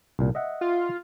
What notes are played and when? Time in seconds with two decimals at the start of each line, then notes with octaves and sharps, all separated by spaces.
0.19 C2 A#2
0.35 D#5 E5 F#5
0.61 F4